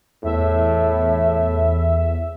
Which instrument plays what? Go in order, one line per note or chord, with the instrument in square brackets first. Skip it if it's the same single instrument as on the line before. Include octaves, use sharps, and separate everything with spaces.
[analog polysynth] E2 E5 [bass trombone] A2